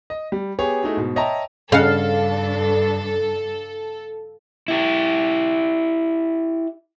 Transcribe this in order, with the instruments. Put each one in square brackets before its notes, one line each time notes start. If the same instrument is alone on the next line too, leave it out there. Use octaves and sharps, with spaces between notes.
[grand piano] D#5
G3
B3 G4 G#4 C#5
A3 D#4 E4 F#4 G#4
G#2 B2
C#5 D#5 E5 G5 A5 A#5
[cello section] G2 D4 [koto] C#3 F#5 [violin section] A4 [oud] F5
[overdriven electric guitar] E4 G4